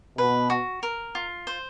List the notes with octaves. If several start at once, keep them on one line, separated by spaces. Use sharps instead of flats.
B2 B4
F#4
A#4
F4
C5